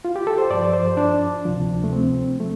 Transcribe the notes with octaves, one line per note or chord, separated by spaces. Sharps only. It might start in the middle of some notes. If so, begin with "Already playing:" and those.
F4
G4
A4
C5
G2 F3 D5
C5
D4
D2 C3 F3
A3
C4
F3 A3